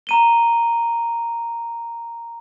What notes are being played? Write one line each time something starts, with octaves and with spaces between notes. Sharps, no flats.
A#5 D#7 G7